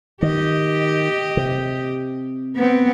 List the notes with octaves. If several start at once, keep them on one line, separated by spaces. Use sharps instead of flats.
D#3 G4 D#5
C3
B3 C4